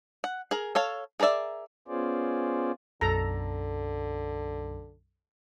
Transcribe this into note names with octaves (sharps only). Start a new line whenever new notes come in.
F#5
G#4 A#4
A4 C#5 F5
G#4 A#4 B4 D5 E5
B3 C#4 F4 G#4 C5 D5
B1 F#2 D3 A4 A#5